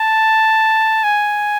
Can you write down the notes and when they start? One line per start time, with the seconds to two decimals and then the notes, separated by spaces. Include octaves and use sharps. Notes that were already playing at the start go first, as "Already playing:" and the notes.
Already playing: A5
1.04 G#5